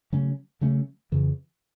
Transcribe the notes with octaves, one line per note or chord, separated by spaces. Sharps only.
C#3 F#3 A3 C#4
C#3 F#3 A3 C#4
F2 C#3 E3